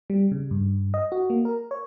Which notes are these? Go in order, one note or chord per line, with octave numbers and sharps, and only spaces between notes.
G3
C#3
G2
D#5
F#4
A#3
A#4
C#5